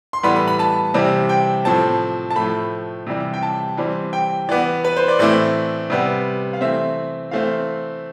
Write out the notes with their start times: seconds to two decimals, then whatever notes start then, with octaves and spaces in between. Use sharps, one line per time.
0.13 C6
0.23 A2 E3 G3 B3 B5
0.36 B5
0.48 B5
0.59 A5
0.94 C3 E3 G3 C4
1.29 G5
1.65 A2 F3 C4 A5
2.30 A5
2.36 A2 F3 A3 B5
3.07 C3 E3 G3
3.34 G5
3.43 A5
3.77 E3 G3 C4
4.13 G5
4.49 E3 B3 D5
4.84 B4
4.96 C5
5.08 D5
5.19 A2 E3 A3 C4 D5
5.90 C3 G3 B3
6.53 F5
6.61 E3 A3 C4 E5
7.31 E3 A3 C4 F5